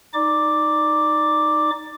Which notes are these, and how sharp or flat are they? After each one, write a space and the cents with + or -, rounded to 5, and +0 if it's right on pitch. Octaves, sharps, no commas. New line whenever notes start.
D#4 +0 D5 +10 D6 +0